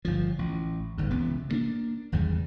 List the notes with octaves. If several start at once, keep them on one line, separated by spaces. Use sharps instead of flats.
G1 F3
A1
G1 G#2
C#2 C3 E3 B3
G2 A#3 D4
G#1 E2 C#3 G3